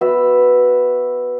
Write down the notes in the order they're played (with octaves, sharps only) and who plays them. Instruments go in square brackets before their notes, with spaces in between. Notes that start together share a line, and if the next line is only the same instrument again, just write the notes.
[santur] B3 F#4 B4 E5